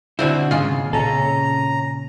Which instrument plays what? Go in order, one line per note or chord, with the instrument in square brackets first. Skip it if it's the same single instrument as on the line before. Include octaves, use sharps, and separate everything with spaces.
[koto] B2 D3 C4 [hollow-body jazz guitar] E4 F#4
[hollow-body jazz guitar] D#2 G#2 C#3 [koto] G#3 F4
[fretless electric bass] A#2 C#3 [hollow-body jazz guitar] C#4 A4 [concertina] A#5